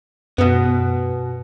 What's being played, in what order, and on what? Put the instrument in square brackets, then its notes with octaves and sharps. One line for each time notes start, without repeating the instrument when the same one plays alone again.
[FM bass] F#2 [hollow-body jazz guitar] B2 B3